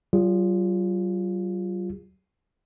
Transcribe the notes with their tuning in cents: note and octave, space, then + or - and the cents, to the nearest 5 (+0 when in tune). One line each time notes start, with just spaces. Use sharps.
F#3 +45 F4 +0 G#4 -35